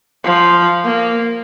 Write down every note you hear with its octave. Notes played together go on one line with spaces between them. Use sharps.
F3
A#3